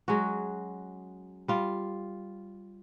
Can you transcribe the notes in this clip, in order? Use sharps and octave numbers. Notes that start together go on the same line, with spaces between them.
F#3 G#3 C#4 F#4
G3 F4